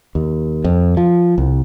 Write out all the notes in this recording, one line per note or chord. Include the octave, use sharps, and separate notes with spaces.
D#2
F2
F3
C2